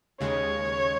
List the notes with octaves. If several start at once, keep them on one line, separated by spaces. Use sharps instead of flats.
D#2 C#3 G#3 C#5